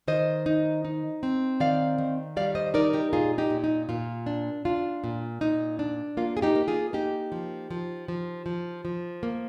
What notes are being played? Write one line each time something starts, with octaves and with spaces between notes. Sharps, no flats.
D#3 C5 D#5
D#4
D#4
C4
D#3 D5 F5
D#3
G3 D5 F5
C5 D#5
D#4 A#4 D5
G4 A#4
A#2 F4 G#4
D#4 G4
A#2
D#4
A#2 F4
D4
D4 F4
A#2
A#2 D#4
D4
A#3 F4
G#4
D#4 G4
A#3
F4 G#4
A#3 D#4 G4
F3
F3
F3
F3
F3
A#3